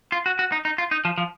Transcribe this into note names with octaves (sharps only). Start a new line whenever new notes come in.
F4
F#4
F#4
D#4
D#4
F4
D#4
F3
F3